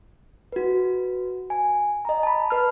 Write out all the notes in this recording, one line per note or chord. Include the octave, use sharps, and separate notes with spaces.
F#4 B4
G#5
D#5 A#5
A5 B5
B4 F6